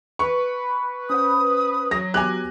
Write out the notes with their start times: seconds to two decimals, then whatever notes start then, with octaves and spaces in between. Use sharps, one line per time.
0.19 B4 C#6
1.10 C#4 C5 F#5 D#6
1.91 F#3 A#6
2.14 B3 G4 G#5 D6 F6 F#6